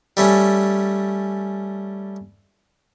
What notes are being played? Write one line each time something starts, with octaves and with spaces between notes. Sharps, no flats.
G3 A3 C#4